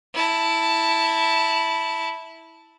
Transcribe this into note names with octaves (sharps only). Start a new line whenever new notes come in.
E4 A5